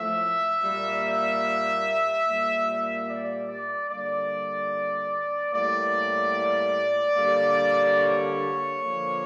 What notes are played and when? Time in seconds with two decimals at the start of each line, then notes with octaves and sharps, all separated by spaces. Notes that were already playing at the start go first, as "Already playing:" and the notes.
Already playing: A2 F3 A3 E5
0.61 A#2 G3 A#3
2.25 A#2 G3 A#3
3.07 D5
3.48 D5
3.88 D3 G3 A#3 D5
5.53 A2 G3 A#3 D5
7.16 D3 G3 A#3
7.99 C#5
8.80 D3 F3 A#3